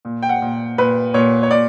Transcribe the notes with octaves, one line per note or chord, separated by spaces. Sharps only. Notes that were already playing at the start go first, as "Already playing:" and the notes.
A#2
G5
F#5
A#2
A#2 B4
A#2 C#5
C#5
A#2 D5